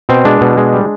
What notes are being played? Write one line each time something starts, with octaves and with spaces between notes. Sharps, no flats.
B2 C4
G#3 D4
B2
G#3
G3